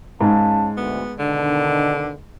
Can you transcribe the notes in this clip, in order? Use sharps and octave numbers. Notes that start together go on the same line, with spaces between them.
G#2 C#4 F5 A5
D2 B3
B2 D3 D#3 D4